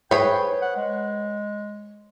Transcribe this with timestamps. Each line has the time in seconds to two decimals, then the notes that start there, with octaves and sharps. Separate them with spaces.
0.11 G#4 B4 C#5 G5
0.62 F#5
0.76 G#3